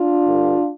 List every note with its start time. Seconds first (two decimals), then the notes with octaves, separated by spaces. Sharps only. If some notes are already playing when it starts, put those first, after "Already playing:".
Already playing: D4 F4
0.25 G2 D3